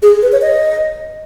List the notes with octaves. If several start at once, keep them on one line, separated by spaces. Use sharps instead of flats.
G#4
B4
C#5
D#5